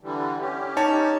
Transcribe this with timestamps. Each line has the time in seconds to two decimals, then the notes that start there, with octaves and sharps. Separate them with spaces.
0.01 D3 E3 G3
0.41 C#4 G4
0.77 D#4 C#5 A5